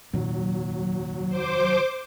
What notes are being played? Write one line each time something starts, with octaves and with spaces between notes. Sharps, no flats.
F1 D#2 A#2 D#3 F#3
C5 D6